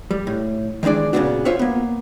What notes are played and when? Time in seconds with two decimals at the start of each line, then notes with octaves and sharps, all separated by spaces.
0.11 G3
0.27 A2
0.83 D#3 E3 G#3 D4 D5
1.13 A#2 C#3 B3 C4 D4 F#4
1.45 F4 C5 C#5 E5 F#5
1.59 A#3 B3